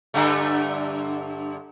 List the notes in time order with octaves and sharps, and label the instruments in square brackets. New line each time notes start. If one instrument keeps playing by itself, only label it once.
[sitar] G2 D3 A3